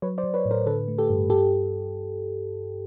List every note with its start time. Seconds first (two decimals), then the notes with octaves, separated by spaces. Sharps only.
0.02 F#3 B4 C#5
0.18 C5 D5
0.24 F#3
0.34 B4 C#5
0.45 A2
0.51 A#4 C5
0.66 D3 A4 B4
0.88 A3
0.98 G4 A4
1.10 G2
1.30 G2 G4 A4